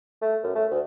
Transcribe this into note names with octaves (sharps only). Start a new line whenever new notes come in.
A3
F#2
A3
D2